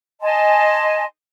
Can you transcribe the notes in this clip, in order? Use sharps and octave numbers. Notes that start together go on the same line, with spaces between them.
D#5 G#5 A5 C6